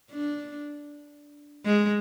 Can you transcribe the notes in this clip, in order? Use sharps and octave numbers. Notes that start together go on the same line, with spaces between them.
D4
G#3